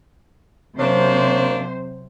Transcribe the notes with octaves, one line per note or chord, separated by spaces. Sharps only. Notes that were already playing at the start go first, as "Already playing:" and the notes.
C3 F#3 A#3 C#4 D4 C5